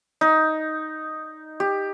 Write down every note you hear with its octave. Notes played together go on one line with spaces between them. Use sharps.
D#4
G4